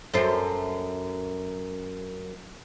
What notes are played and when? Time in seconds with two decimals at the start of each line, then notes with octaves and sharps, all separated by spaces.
0.14 F#2 A4 C5